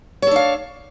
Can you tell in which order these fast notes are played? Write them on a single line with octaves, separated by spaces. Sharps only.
C#5 A4 D4 F5